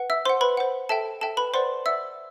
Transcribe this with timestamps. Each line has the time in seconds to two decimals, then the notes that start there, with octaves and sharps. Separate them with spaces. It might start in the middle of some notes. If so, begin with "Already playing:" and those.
Already playing: B4 F#5
0.10 E5 E6
0.25 C5 F#5 C6
0.41 B4 B5
0.57 C5 F#5
0.89 A4 E5 G5 A5
1.21 A4 E5 G5 A5
1.37 B4 B5
1.54 B4 C5 D5 F#5 C6
1.86 B4 D5 E5 F#5 E6